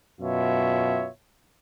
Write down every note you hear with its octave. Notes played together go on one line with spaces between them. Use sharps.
F#2 B2 F4 C#5 E5